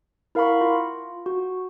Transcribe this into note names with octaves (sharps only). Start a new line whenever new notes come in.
E4 A#4 F5 F#5 B5 C#6
F4
F#4